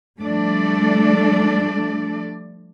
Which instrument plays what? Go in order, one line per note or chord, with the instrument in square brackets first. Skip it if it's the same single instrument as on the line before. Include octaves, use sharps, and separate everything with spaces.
[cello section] F3 G3 A3 D4 A4 D5